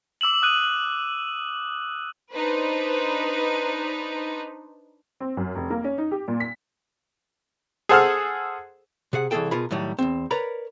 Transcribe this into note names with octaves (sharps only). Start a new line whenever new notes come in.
D6 E6 E7 F#7
D#6 F#6 D#7
D4 D#4 B4 C5
C4
F#2
F1
A#3
C#4
D#4
G4
A#2
B6
G#4 A4 C5 F#5 E6 F6
C3 G#4 F#5
C2 E3 F#3 G#4 A4 G5
B2 F4 G#4 A#4 B5
A2 D#3 F#3 G3
E2 C#3 C4
A#4 B4 C#5 D5 A#5 B5